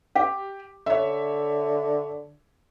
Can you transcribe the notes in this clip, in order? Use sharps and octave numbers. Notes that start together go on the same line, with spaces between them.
G4
D3 C#5 E5